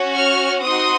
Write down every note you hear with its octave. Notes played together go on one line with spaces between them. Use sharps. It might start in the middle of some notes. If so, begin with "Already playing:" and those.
Already playing: C#4 F#4
C#6 F6
C4 D#4 F#4 C6 D#6